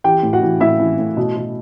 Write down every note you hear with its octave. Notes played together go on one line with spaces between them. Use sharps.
E3 G4 G5
A2
F#4 F#5
E3
A2 E4 E5
E3
A2
B2
B2